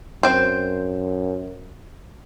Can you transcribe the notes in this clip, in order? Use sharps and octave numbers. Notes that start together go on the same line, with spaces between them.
F#2 C4 C5